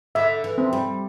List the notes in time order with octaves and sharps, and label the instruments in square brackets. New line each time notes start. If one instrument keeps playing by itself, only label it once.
[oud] D3 [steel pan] E5
[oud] E3
[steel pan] C4
[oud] G3